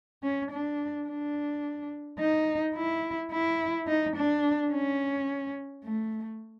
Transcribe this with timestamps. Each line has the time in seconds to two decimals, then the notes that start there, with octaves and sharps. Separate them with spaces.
0.23 C#4
0.51 D4
1.07 D4
2.19 D#4
2.75 E4
3.32 E4
3.87 D#4
4.16 D4
4.71 C#4
5.84 A3